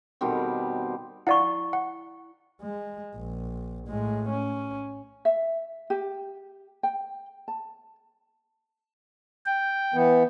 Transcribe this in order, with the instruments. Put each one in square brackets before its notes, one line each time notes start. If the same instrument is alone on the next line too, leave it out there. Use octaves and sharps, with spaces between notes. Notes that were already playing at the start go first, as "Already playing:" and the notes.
[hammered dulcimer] B2 D#3 G3 C4
[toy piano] E4 C#6 [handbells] D5 F5 F#5
[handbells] F#5
[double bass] G#3
A#1
A2 G#3
C#4
[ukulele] E5
G4
G5
A5
[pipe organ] G5
[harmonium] E3 B3